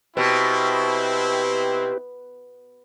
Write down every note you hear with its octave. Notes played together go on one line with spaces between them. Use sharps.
B2 C4 E4 G4 B4